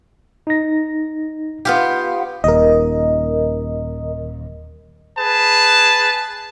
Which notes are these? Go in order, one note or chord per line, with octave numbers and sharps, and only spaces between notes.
D#4 A#6
B3 F4 G4
D#1 D#2 A#4 D#5
G#4 B4 A5